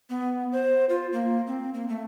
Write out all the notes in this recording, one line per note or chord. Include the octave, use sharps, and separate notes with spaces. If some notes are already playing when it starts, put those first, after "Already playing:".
B3
C5
F4
A#3
C4
A#3
A3